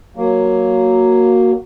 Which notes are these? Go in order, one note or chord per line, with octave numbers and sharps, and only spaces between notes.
F#3 A#3